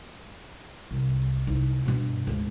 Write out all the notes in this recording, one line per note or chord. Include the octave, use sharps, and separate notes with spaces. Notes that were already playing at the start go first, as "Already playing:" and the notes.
C2
C2 D#4
G2 B2
D2 G#2